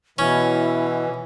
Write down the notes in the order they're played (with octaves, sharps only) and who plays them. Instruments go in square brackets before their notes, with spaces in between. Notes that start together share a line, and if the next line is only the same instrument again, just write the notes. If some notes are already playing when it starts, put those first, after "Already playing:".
[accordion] B2 [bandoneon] E3 [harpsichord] C#4 [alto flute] E4